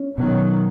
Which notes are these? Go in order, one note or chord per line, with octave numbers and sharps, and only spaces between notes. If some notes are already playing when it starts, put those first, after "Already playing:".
Already playing: C#4
B2 D#3 F#3